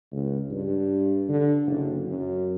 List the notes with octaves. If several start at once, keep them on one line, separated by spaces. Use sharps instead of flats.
C#2
G2
D3
F#1
F#2